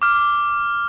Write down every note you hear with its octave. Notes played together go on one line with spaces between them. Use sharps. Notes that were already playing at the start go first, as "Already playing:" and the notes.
D6 F6